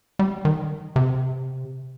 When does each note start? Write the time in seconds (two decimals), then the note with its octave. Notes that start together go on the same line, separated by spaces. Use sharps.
0.19 G3
0.45 D#3
0.96 C3